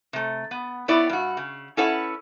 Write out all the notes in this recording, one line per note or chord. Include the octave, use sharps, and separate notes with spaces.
C3 A3
B3
B3 E4 C#5 D5
G2 F#4
C#3
C#4 E4 A4 B4 C#5 F#5